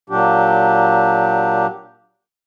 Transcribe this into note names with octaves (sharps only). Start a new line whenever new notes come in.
A#2 F#3 D4 G4